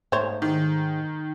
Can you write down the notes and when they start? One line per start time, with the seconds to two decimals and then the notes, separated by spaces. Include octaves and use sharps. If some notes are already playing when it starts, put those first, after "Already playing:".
0.12 G#2 A3 C5 C#5
0.42 D#3